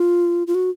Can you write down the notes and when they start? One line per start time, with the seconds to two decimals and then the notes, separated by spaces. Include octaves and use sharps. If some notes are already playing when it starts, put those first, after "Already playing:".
Already playing: F4
0.47 F4
0.54 F#4